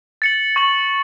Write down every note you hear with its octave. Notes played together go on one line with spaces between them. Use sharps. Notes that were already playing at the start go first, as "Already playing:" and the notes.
A6 C#7 F#7
C#6 A6 F#7